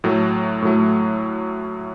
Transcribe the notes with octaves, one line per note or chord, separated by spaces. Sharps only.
A2 F#3 A3
A2 F#3 A3